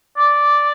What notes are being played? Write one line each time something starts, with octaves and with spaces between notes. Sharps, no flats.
D5